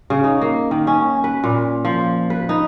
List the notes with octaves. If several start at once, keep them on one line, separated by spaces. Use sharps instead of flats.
C#3
D#4
A#3
D#3
C#4
B4
A#2
F3
B4
D#4